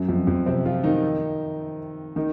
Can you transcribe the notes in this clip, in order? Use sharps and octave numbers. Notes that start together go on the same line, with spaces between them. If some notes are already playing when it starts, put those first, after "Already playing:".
Already playing: F#2 F#3
F2 F3
F2 F3
C3 C4
F3 F4
D#3 D#4
D#3 D#4